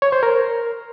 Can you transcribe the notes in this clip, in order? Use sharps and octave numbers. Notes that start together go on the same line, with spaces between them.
C#5
C5
A#4